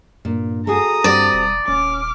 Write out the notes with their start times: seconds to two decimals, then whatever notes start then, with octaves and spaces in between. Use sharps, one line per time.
0.25 G2 A#2
0.67 F#4 G#4 A4 A#5 D#6
1.04 G2 G3 C4 F#4 D5
1.33 E1
1.68 D#1 C#4 D6 F6